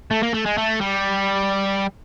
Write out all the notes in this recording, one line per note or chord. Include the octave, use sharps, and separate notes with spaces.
A3
A#3
A3
G#3
A3
G3